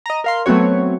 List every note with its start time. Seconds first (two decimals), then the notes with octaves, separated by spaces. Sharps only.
0.06 D#5 A#5
0.24 A#4 F5 C6
0.46 F#3 A3 B3 C4 F#4 C#5